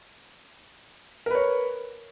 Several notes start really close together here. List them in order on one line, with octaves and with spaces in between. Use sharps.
A#4 B4 C#5